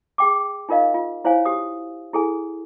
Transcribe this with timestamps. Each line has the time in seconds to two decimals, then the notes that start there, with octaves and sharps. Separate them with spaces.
0.18 G#4 G5 D6
0.69 D#4 F4 A#4 D#5 F5
0.94 F4
1.25 E4 C5 C#5 F5 G#5
1.45 G4 D#6
2.13 E4 G#4 A4 G#5